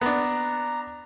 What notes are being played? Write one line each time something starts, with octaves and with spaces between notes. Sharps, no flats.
B3 D4 A#5